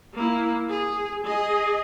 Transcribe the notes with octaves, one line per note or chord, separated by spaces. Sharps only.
A#3 E4
G#4
G#4 D#5